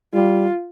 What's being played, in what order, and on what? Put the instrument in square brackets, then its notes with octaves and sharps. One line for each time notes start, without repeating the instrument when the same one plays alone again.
[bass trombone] G3 [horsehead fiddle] F4